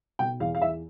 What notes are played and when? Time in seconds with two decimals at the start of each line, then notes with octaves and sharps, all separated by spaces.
0.19 B2 G5
0.40 E2 F5
0.55 F5
0.62 E2 E5